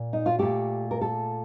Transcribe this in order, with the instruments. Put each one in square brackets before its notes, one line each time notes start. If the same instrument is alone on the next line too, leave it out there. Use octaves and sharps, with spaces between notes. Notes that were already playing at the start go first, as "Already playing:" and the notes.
Already playing: [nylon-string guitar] A#2
D#4
F4
A#2 A3 G4
A#4
A4